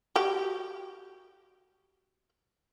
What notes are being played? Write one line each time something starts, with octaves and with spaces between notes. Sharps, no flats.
F#4 G4 G5